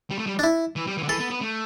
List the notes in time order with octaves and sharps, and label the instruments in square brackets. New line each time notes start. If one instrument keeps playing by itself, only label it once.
[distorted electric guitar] G3
A3
G3
[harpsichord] D4
E4
[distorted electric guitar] E3
G3
E3
D3
[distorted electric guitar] E3 [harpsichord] A4
[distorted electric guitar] B3
B3
A3